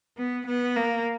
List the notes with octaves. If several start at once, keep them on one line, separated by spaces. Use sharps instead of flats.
B3
B3
A#3